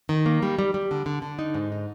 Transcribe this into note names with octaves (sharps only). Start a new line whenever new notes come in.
D#3
A#3
G3
G3
G3
D3
D3
D3
D#4
G#2
D#4